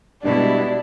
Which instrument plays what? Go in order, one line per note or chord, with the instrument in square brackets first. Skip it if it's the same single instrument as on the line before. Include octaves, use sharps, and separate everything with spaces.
[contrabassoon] G2 [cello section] B2 G#3 E4 [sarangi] D4